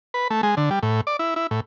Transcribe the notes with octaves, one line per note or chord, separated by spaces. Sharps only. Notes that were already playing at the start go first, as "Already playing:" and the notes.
B4
A3
G#3
D3
G3
A2
D5
E4
E4
A2